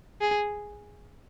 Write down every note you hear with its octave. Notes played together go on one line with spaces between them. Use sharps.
G#4